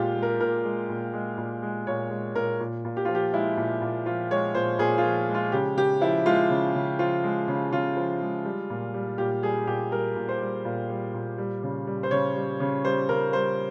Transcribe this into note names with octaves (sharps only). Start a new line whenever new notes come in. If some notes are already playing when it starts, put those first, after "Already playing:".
Already playing: A#2 G#3 F4 G4
G#3
A#4
A#2 A#4
G#3
A#2
G#3
A#2
G#3
A#2 C#5
G#3
A#2 A#4
A#2
A#2
G4
F3 F4
G4
G#3 E4
A#2
A#2
F3 F4
G#3 C#5
A#2 C5
A#2 G#4
F4
F3
G#3
F4
C#3 G4
C#3 G4
F3 E4
G#3 F4
C#3
C#3
F3 F4
G#3
C#3
C#3 F4
F3
G#3
G3
A#2
G3
A#2 G4
G3 G#4
A#2 G4
G3 A#4
A#2
C5
G3
A#2
G3
A#2
G3
C#3
G3
C5
C#3 C#5
G3
C#3
G3 C5
C#3 A#4
G3 C5